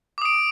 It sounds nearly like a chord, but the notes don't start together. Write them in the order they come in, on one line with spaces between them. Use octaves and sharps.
D6 D#6 D7